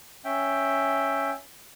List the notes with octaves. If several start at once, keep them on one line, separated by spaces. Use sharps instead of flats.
C#4 E5 G5